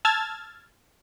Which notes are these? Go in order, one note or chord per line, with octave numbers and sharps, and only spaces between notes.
A5 E6 F6 G#6 A6